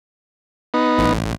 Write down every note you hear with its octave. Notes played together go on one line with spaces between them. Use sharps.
B3 D#4
A1